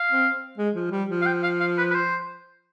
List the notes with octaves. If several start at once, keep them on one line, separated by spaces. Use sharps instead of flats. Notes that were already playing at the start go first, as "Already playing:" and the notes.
Already playing: F5
C4
G#3
F3
G3
F3
F5
G5
F5
F5
B4
B4
C5